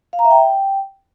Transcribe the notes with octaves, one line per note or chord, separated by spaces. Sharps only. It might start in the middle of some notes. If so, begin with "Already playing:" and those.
F5
A#5
E5
G5